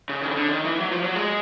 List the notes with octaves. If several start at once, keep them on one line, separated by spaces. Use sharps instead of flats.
C#3
D#3
D3
D#3
E3
F#3
F3
F#3
G#3